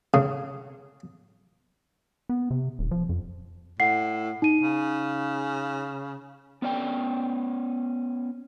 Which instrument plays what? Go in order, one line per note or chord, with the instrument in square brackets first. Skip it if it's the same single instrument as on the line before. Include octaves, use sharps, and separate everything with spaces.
[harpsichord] C#3
[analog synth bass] B3
C3
D#1
F3
F2
[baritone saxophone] A2 [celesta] F#5 C7
[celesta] D#4 D#7
[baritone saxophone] C#3
[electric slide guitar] B3 C#4 D5 G5